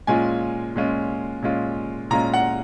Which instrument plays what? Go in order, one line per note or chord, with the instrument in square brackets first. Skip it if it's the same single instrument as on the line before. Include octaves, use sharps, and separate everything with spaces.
[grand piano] A#2 G#3 C#4 F4 G#5
A#2 G#3 C#4 F4
A#2 G#3 C#4 F4
A#2 G#3 C#4 F4 A#5
F#5